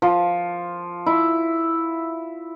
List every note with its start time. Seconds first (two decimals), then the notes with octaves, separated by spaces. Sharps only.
0.02 F3
1.06 E4